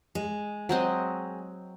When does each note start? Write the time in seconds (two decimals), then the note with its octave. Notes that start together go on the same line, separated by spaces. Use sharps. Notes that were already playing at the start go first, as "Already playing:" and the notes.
0.15 G#3
0.69 F#3 C4 D#5